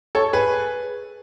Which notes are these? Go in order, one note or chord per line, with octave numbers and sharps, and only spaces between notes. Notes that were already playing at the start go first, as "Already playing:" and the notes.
A4 C#5
G#4 B4